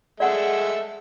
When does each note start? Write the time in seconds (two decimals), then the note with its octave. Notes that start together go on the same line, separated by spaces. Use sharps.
0.20 G#3 A4 D5 E5 F#5